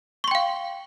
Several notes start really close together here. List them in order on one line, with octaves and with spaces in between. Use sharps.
C#6 C6 G5 F5